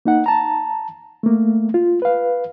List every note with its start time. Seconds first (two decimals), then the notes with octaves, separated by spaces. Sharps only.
0.05 A#3 D#4 F#5
0.26 A5 A#5
1.23 A3 A#3
1.74 F4
2.02 B4 F5